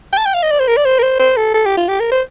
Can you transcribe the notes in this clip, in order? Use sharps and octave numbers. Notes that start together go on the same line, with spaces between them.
G5
A5
G5
F5
D#5
D5
C5
A#4
D5
C5
A#4
C5
C5
A4
A4
G4
F4
G4
A#4
C5